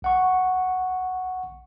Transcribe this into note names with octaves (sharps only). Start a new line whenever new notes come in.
A#1 F#5 C#6